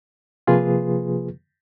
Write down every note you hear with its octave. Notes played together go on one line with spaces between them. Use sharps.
C3 F3 A#3 F4 G#4 B4